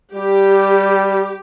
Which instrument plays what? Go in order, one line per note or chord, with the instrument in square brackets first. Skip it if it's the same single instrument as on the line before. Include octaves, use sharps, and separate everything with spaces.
[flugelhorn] G3 [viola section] G4